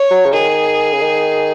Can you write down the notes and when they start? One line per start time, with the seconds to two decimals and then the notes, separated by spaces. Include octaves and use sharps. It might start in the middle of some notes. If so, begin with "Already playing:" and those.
Already playing: C#5
0.11 F#3
0.26 C#3
0.33 D#3 G#4
0.93 C#3
1.01 D#3